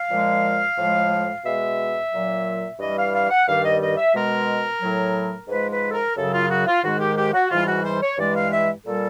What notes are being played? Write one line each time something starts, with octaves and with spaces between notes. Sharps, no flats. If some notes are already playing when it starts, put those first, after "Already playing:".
Already playing: F5
A#2 F3 G#3
A2 F3 G#3
B2 G#3 E5
A#2 F#3
G2 E3 G3 D#5
F5
F5
F#5
G2 D#3 G3 F5
D#5
D#5
E5
B2 G#3 A#4
A2 F#3
G#2 F3 G#3 B4
B4
A4
A#4
F#2 C#3 F#3 A4
F4
F#4
F4
G#2 D#3 G#3 F#4
G4
G4
F#4
G#2 E3 G3 F4
F#4
C5
C#5
G2 E3 G#3 D5
F5
E5
A#2 G3 A4